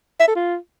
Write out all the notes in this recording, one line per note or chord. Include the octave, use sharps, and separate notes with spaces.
E5
A4
F4